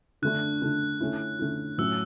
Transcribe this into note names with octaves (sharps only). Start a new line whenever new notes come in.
D3 A3 D4 F#6
D3 A3 D4
D3 A3 C#4 E4
D3 A3 C#4 E4
A2 F#3 C#4 E6